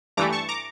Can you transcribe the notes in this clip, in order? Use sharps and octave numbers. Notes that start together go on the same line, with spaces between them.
G2 E3 A3 A#5 D6
A5 C#6
A#5 D6